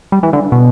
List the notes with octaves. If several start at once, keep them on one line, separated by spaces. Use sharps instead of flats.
G3
E3
D3
B2